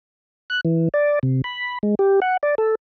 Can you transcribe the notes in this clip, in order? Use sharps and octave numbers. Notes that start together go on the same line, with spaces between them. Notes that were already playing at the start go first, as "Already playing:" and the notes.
F#6
E3
D5
C3
B5
G#3
G4
F#5
D5
A4